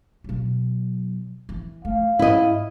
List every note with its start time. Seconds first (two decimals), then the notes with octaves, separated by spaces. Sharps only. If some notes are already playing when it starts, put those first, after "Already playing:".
0.24 B2 F#3
1.49 E3
1.85 A3 F5
2.19 G#2 E4 D#5